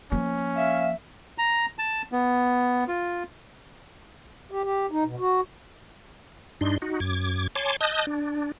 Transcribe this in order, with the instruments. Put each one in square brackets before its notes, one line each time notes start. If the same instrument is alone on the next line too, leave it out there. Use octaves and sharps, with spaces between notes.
[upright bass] F3 A#3 [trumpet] C#4
[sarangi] E5 [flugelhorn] F5
[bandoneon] A#5
A5
B3
F4
[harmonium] G4
G4
D#4
B2
F#4
[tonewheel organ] G2 D4 D#4 C6
D#4 F#4
F#2 D6 G#6
C#5 G#5 A5 C6 D6
D#5 A5 D#6 F#6 G6
D4